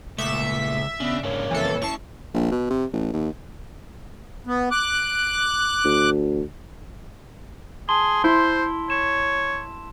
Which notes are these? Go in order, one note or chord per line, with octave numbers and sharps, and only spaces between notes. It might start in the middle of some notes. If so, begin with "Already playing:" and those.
C#2 A#2 A3 E5
C#3 B3 D4
G#2 C#3 A#3 D4 C#5
F2 A#2 E3 C4 A4
D#2 C#4 E4 A5 C#6 C7
A#1
B2
C3
A1
D#2
B3
D6 F#6
D2
G#4 A5 C6 G7
E4 C5
C#5 E7